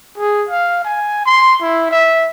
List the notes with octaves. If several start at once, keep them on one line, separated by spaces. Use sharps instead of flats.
G#4
F5
G#5
C6
E4
E5